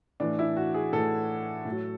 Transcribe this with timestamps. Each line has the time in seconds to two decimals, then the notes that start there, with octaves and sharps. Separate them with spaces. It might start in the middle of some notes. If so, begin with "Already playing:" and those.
0.20 A2 E3 D4
0.39 E4
0.56 F#4
0.74 G#4
0.93 A2 E3 A4
1.65 A2
1.70 F#3